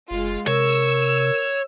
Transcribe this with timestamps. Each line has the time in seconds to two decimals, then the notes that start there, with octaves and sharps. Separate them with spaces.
0.11 F#1 G#3 F4
0.47 C3 A#4 C#5 E6